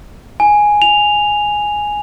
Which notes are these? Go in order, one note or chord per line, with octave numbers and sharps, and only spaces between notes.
G#5
F7